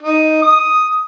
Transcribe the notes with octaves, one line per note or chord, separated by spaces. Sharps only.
D#4
D#6